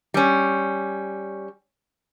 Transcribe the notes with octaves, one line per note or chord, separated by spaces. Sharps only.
G3 C#4